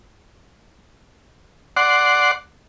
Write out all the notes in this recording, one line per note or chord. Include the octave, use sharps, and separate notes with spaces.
D5 F#5 C6